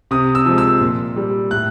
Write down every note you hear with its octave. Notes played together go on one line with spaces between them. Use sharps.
C3 D#6
E6
F3 G#3
E6
A#2
G3
A2 F#6